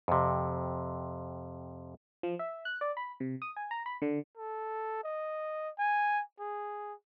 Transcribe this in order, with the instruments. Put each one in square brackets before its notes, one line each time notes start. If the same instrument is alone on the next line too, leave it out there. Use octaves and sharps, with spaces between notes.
[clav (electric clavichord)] F2 C3
[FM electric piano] F3
E5
F#6
D5
B5
C3
D#6
G#5
A#5
B5
D3
[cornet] A4
D#5
G#5
G#4